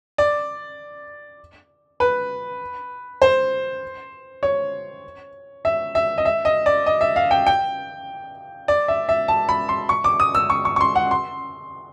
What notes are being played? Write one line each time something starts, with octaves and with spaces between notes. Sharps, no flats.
D5
B4
C5
C#5
E5
E5
D#5
E5
D#5
D5
D#5
E5
F5
G5
G5
D5
E5
E5
A5
B5
C6
C#6
D6
D#6
E6
C#6
C#6
C#6
C6
F#5
C6